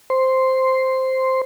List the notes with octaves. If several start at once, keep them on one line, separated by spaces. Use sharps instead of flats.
C5 C6